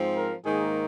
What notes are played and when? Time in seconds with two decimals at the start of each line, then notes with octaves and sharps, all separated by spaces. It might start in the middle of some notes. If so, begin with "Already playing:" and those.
Already playing: G#2 F3 C4
0.16 A#4
0.45 G#2 D#3 A#3 G#4